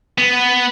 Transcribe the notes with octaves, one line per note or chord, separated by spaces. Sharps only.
B3